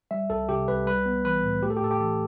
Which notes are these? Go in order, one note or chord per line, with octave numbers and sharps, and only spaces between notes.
G3 E5
C2 A4
C3 G4
C2 B4
G3 B4
B3
E3 B4
A2
A3 G4
A4
G4
A2 A4
G4
E3 A4